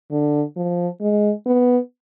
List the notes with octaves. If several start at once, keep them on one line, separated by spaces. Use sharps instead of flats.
D3
F3
G#3
B3